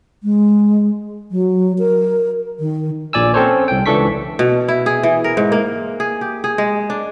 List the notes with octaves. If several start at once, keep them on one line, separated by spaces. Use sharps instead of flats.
G#3
F#3
A#4
D#3
A#1 A#2 D5 G#5 E6
C4 C#4 A4 C5 C#5
C2 G5
C#2 E3 D4 A4 C#6 B6
B2
E4
G#4
E3
A#4
G#2
A#3
G#4
G4
G#4
G#3
D4